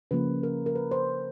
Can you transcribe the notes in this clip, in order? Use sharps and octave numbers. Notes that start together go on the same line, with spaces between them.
C#3 F3 A#3 B4
A#4
A#4
B4
C5